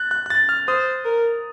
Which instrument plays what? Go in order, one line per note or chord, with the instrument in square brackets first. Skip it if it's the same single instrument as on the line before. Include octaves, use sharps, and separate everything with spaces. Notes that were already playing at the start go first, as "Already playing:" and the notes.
Already playing: [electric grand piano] F#6 A6
F#6
F#6
A6
F6
[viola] C5 [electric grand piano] D#6
[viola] A#4